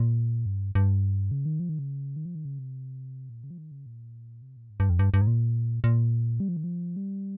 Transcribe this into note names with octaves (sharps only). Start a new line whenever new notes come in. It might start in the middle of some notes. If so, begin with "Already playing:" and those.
Already playing: A#2
G2
G2
C#3
D#3
F3
D#3
C#3
D#3
F3
D#3
C#3
C3
A#2
C#3
F3
D#3
C#3
A#2
C3
A#2
G#2
G2
F2
G2
G2
G#2
A#2
A#2
G3
F3
D#3
F3
G3